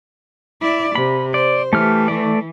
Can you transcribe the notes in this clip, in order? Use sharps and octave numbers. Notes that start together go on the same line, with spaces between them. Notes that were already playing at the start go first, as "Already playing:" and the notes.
E4 D5
C3 B5
C5 D5
E3 A3 G4 F6
A3 D5